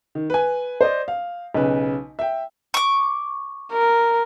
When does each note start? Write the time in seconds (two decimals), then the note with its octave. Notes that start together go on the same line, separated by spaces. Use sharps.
0.15 D#3
0.30 B4 G#5
0.81 C5 D5 D#5
1.08 F5
1.55 B1 C#3 B4
2.19 E5 G5
2.74 C#6 D6
3.72 A#4